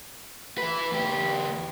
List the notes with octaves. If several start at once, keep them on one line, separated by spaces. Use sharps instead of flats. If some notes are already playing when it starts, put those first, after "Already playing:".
E3 B4
E2 G4